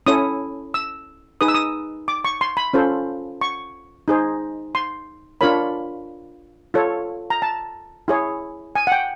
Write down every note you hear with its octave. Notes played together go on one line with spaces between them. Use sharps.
C#4 E4 A4 C#5 D#6
E6
D#4 G#4 B4 D#6
E6
D#6
D6
C#6
C6
B5
C#4 F4 A4 C5
C#6
D#4 G#4 C5
C6
D4 F4 A#4 C#5 B5
F4 A4 C#5
A#5
A5
E4 G#4 C#5
G#5
F#5
G5